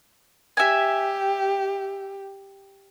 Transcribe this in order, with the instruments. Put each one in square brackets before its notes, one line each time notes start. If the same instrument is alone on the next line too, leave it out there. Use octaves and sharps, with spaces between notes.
[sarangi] G4 [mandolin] E5 G#5